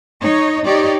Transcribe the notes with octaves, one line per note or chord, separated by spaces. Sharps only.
D#4 C#5
D#4 G4 C#5 D5